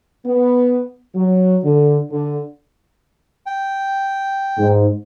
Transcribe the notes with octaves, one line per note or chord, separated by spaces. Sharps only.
B3
F#3
D3
D3
G5
G#2